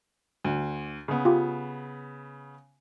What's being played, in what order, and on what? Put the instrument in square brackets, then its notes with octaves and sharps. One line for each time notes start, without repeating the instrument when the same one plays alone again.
[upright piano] D2
C#3 B3
[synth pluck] F4 G4